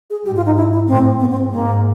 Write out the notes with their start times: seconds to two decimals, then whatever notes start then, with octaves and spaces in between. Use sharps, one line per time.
0.10 G#4
0.25 G#2 G4
0.36 F4
0.46 D#4
0.56 E4
0.72 E4
0.88 A2 C4
1.20 G#2 B3
1.30 C4
1.51 G#2 A#3